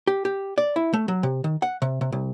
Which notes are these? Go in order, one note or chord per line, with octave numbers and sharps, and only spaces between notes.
G4
G4
D5
E4
A3
F#3
C3
D#3
F#5
C3
C3
C2